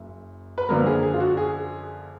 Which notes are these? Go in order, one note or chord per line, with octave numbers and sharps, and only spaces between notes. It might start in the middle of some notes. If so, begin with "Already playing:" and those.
Already playing: F#1 F#2
B4
F#2 D3 F3 A#3 A#4
G#4
G#4
F4
F#4
G#4